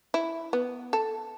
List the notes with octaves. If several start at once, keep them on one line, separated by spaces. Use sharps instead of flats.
E4
B3
A4